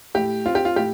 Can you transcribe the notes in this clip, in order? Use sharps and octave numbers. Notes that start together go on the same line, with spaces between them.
A2 G4
C4 F4
G4
F4
A2 G4